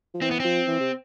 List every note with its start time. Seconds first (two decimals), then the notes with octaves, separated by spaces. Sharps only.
0.14 F3
0.22 E3 C4
0.31 B3
0.40 F3 C4
0.67 E3
0.80 C3